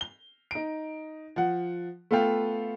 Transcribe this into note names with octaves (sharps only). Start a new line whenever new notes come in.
G7
D#4 D7
F3 F#5
A3 B3 F4 A4 F5 G5